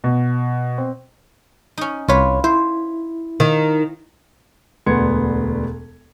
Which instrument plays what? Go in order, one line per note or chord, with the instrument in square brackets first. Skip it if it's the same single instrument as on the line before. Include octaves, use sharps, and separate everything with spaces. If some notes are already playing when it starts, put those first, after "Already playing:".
[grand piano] B2
C4
[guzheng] C#4 D#4
[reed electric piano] C2 C#5 [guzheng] F4 B4
[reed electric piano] E4 [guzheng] C5
[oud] D#3
[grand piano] E1 D2 B3 C6 G#6 C#7